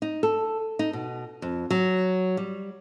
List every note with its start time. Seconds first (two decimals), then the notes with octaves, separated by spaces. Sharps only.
0.02 D#4
0.23 A4
0.79 D#4
0.93 B2
1.42 F2
1.70 F#3
2.37 G3